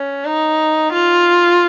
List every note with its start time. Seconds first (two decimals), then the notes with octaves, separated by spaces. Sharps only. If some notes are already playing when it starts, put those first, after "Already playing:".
Already playing: C#4
0.25 D#4
0.93 F4